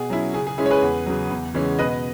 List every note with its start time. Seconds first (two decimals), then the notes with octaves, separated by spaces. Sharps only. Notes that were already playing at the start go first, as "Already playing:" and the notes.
Already playing: B2 G#4
0.10 F#3 C#4 E4
0.34 C#3 G#4
0.47 G#4
0.58 G#3 C#4 E4 G#4
0.66 C#5
0.71 G#4 B4
0.82 E2
1.06 C#3 F#3
1.31 E2
1.54 C#3 E3 G#3 C#4
1.79 B2 B4 D#5